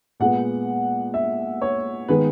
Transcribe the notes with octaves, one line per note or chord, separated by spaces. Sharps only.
A#2 G#3 B3 F#5
E5
C#5
D#3 G#3 B3 B4